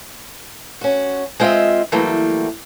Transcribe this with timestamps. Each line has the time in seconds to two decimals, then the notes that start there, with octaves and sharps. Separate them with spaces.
0.81 C#4 F#4
1.40 G#3 C4 F4 C5 D#5 E5
1.92 E3 F#3 G3 A3 A#3